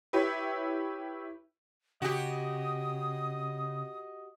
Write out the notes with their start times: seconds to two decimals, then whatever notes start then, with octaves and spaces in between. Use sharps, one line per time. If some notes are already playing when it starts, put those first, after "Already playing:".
0.13 E4 G4 B4 C#5 E5
2.02 C#3 F#4 G4 D#5 D#6